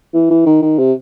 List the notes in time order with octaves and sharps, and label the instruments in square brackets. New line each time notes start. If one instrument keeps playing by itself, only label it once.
[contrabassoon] E3
E3
D#3
D#3
C3